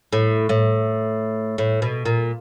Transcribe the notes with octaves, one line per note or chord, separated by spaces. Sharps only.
A2
A2
A2
B2
A#2